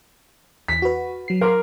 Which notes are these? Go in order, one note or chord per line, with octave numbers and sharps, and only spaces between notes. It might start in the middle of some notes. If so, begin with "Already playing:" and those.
E2 B6
F#4 B4
F#3 C7
A#4 F5 C6 D6